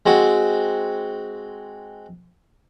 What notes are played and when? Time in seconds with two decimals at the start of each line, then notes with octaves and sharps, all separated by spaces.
0.06 G#3 C4 F#4